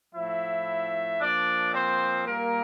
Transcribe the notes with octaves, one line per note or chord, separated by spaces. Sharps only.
A2 F3 E4 E5
A#2 F3 D4 D5
C4 C5
A#2 G3 A#3 A#4